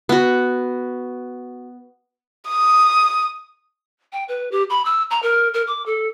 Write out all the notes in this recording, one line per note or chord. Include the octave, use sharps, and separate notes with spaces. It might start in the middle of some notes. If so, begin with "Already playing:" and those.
B3 F#4
D#6
G5
B4
G4
B5
E6
A#5
A#4
A#4
D6
A4